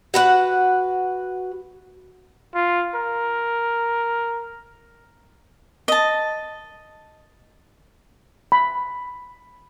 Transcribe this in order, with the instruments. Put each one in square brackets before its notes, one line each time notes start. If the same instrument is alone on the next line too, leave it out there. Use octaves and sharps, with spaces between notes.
[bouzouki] F#4 B4 F#5
[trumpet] F4
A#4
[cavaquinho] D#5 A5
[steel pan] B5